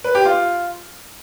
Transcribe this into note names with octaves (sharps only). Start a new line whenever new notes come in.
B4
G4
F4